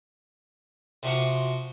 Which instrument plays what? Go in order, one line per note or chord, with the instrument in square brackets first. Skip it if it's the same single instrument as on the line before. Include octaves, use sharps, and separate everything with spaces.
[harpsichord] C3 F3 F#4